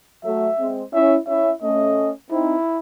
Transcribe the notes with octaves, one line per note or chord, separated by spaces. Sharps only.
F#3 A3 E5
G#3 C4
C#4 E4 E5
C#4 E4 E5
A3 C#4 D#5
C4 D#4 E4